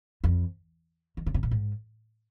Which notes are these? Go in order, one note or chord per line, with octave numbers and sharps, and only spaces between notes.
F2
D#3
C#3
C3
A#2
G#2